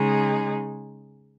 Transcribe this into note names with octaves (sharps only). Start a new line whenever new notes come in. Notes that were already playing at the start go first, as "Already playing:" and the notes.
Already playing: C#3 G#3 D#4 G#4